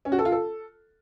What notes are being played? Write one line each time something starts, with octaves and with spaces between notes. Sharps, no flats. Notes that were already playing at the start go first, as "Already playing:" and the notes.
C#4
F#4
A4
F4
A4